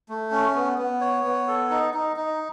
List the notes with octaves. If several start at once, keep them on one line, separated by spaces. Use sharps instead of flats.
A3
C#4
B3
B3
C#5
B3
A4
D#4
D#4
D#4